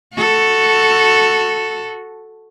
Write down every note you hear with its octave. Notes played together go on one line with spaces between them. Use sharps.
F#4 A4